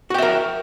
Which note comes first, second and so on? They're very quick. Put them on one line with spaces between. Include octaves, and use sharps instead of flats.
F#4 G5 E5 A#4